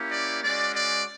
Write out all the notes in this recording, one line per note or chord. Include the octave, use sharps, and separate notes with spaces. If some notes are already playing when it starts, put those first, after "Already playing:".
Already playing: A#3 C#4 E4 G4
D5
G#3 C#4 F#4 D5
D5